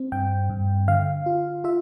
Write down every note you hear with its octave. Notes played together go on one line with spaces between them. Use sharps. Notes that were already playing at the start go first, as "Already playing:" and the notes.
Already playing: C4
G2 G5
G2
D3 F5
F4
F4 E5